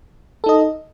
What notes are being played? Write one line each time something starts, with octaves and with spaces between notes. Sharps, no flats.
D#4 A4 D#5